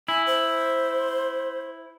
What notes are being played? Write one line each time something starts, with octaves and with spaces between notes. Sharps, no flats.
E4 G#5
C5